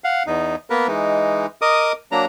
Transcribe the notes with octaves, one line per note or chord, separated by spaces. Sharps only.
F5 F#5
E2 D#4
A#3 B3 A#4 B4
E3 G#3 D#4
A#4 D#5 D6 D#6
F#3 A#3 D4 A#5